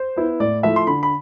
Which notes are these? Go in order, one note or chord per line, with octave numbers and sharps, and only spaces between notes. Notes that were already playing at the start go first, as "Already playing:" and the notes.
Already playing: C5
B3 E4
A2 D5
F3 A3 E4 E5
C6
D3 B5
B5